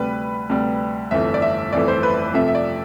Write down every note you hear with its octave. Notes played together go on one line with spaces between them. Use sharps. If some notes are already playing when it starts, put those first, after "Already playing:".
Already playing: D2 C3 G3 B4
D2 C3 G3
G1 F2 E3 A3 E5
D5
E5
G1 F2 E3 A3 D5
C5
B4
F2 C3 F3 A3 E5
E5
D5